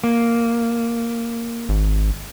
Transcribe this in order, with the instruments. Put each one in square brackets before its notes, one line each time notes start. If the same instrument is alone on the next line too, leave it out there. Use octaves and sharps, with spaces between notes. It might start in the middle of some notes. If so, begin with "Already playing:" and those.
[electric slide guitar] A#3
[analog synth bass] G#1